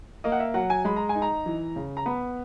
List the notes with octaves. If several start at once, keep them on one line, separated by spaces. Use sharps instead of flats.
A#3 D#5
F#5
E5
F#3 F#5
G#5
G#3 B5
A#5
G#5
D#4
A#5
E3
C#3
A#5
B3 B5